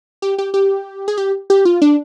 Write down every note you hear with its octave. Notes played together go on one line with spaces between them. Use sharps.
G4
G4
G4
G#4
G4
G4
F4
D4